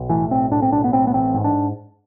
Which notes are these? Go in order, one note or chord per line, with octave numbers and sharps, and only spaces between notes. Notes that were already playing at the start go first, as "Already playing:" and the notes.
Already playing: B1
A2 E3
B1 C4
A2 D4
C4
B1 D4
B3
A2 C4
B3
A1 C4
G#2
D4